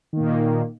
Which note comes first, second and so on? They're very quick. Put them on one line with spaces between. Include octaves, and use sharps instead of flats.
D#3 A#3 A#2